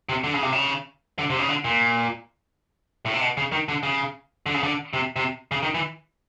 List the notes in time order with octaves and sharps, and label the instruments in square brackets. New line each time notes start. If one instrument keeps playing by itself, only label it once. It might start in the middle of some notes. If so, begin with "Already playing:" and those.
[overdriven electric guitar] C3
D3
C#3
C3
C#3
D3
C3
C#3
D3
A#2
A2
C3
B2
C#3
D#3
D3
C#3
D3
C#3
D3
C3
C3
C#3
D#3
E3